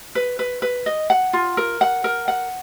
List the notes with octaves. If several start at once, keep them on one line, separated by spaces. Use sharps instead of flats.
B4
B4
B4
D#5
F#5
F4
A#4
F#5
A#4
F#5